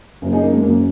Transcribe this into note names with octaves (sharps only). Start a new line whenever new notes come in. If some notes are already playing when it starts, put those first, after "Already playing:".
F#1 F#2 F#3
D#4 G#4
A#3
G#3
F#1 F#2 F#3 A#3